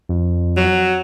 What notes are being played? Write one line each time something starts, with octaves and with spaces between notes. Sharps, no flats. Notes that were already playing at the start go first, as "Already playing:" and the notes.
F2
F#3